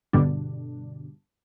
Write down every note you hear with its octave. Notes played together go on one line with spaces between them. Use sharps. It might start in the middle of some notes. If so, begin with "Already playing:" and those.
G2 B2 D3 G3 D4